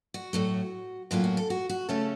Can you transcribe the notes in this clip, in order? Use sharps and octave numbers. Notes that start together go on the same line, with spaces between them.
F#4
A2 F#3 A3
A2 F#3 A#3 C#4 F4
F#4
A4
F#4
F#4
C#3 A3 C#4 A4